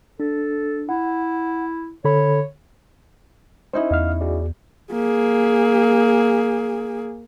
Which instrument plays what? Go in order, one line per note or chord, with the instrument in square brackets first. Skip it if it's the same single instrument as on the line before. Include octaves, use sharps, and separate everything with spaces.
[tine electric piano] D4 [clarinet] A4
[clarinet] E4 [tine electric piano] F#5
[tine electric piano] D3 A4 B5 [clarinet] C#5
[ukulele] C#4 D#4 E4 [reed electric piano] C5
[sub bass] E2 [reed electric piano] D#5 F5 F6
[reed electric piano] F#4 G#4 D5
[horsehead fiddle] A#3 G#4